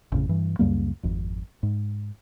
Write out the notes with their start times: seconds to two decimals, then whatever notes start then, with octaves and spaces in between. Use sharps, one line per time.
0.12 A1 F2 A2 C#3
0.29 G2 E3
0.59 C#2 F#2 G3 A#3
1.03 G#1 F2
1.63 G#2